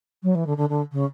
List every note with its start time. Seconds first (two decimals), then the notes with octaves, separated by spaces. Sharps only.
0.23 F#3
0.35 E3
0.47 D3
0.57 D3
0.69 D3
0.92 C#3